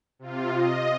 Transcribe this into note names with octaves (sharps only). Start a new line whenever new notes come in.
C3 F4
D#5